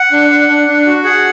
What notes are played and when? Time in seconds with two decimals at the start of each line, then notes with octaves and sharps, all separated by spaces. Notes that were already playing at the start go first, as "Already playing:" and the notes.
Already playing: F#5
0.11 D4
0.31 D4
0.48 D4
0.68 D4
0.86 F#4
1.04 G#4 F#5